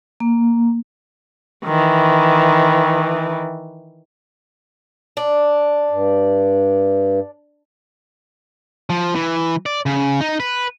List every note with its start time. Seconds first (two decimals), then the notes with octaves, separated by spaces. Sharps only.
0.20 A#3
1.65 D#3 E3
5.17 D4
5.91 G2
8.90 F3
9.15 E3
9.66 D5
9.86 C#3
10.21 D#4
10.40 B4